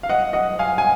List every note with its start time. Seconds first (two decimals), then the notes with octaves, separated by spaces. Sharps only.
0.03 F5
0.09 D#5 F#5
0.33 D#5 F#5
0.59 F5 G#5
0.78 G#5